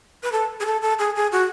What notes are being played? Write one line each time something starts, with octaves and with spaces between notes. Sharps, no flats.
B4
A4
G#4
A4
A4
G#4
G#4
F#4